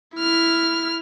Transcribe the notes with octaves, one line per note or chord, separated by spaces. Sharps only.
E4 F6